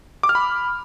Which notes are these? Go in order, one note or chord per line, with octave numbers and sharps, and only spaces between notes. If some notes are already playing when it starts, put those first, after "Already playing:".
D6
F6
B5